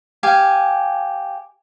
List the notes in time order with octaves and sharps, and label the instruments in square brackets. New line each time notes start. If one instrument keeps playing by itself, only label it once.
[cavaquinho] G4 F5 G#5